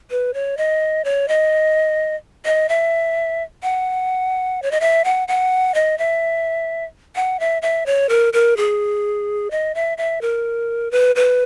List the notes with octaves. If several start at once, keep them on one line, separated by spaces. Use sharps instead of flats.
B4
C#5
D#5
C#5
D#5
D#5
E5
F#5
C#5
D#5
E5
F#5
F#5
D#5
E5
F#5
E5
E5
C#5
A#4
A#4
G#4
D#5
E5
E5
A#4
B4
B4